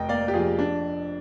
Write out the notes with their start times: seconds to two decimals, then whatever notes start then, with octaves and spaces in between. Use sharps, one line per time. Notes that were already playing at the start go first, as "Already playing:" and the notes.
Already playing: F1 D#5 G5
0.09 A#3 D5 F5
0.28 G4
0.34 F2 F4 G#4
0.59 D4